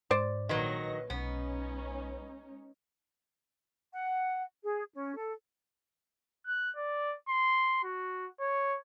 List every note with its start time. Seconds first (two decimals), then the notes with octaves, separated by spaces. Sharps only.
0.11 G#2 C5 D5
0.49 A#1 D#3 F#3 B4 C#5 D#5 A#6
1.10 B1 G#3 B3 C#4 D#4
3.93 F#5
4.63 G#4
4.94 C#4
5.17 A4
6.46 F#6
6.76 D5
7.29 C6
7.84 F#4
8.40 C#5